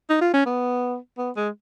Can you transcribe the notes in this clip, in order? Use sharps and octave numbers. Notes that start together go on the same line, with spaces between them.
D#4
F4
C#4
B3
B3
G#3